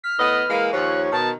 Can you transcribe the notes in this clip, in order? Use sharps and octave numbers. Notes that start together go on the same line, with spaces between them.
F6 B6
A2 B3 B4 D#5
E3 G#3 A#3
D#2 F3 C#5 F#6
B2 D#3 A5